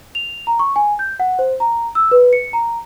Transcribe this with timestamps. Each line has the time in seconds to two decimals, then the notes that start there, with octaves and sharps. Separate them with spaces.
0.15 F7
0.47 A#5
0.59 C#6
0.76 G#5
0.99 G6
1.20 F#5
1.39 C5
1.60 A#5
1.95 E6
2.11 B4
2.33 C#7
2.53 A#5